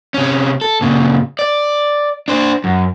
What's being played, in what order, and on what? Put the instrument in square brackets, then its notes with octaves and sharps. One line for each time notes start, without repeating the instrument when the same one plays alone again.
[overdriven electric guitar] C3 C#4
A4
A#2 C#3
D5
D4 C5
F#2